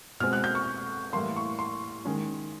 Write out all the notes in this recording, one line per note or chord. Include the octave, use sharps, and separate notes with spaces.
B2 G#3 C4 F6
F#6
G6
C#6
A2 E3 G3 A#3 C6
C#6
C6
D#3 G#3 C#4